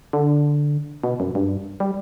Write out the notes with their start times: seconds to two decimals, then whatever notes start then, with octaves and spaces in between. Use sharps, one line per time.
0.13 D3
1.04 B2
1.20 F#2
1.35 G2
1.80 G3